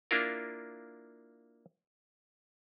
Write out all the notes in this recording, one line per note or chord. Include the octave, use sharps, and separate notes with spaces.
A#3 D4 E4 F4 A#4